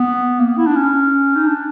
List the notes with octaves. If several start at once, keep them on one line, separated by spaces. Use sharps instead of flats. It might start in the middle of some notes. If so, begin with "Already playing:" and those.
Already playing: B3
A#3
B3
E4
D4
C#4
D#4
D4